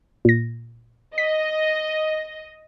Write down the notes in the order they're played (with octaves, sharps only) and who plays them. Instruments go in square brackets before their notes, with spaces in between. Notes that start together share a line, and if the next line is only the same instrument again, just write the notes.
[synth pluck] A#2 A#6
[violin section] D#5 [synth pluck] B6